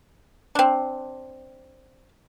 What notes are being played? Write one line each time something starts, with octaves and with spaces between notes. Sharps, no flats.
C4 D4